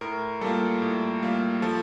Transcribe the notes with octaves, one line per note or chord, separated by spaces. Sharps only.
A2 A#4
G3 A#3 F4 A4
A2
G3 A#3 F4
F3 A4